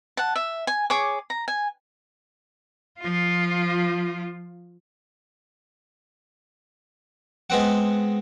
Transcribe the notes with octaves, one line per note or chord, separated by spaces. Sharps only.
F#5 A5
E5
G#5
G#4 C#5 D6
A#5
G#5
F3 F4
G#3 B3 C4 F#5